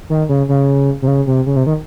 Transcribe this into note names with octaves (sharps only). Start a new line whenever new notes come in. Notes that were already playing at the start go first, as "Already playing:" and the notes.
D#3
C#3
C#3
C3
C#3
C3
C#3
C3
D#3